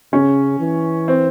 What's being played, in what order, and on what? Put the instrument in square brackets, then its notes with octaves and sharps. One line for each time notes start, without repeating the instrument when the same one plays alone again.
[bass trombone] C#3 [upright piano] C#4
[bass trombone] E3
[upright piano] C4